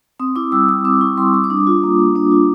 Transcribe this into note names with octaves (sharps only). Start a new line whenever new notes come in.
C4 D#6
E4 D6
G3 E6
G3 D#6
C4 D6
E4 C#6
G3 C6
G3 D6
D6
D4 D#6
F4
A#3
A#3
D4
F4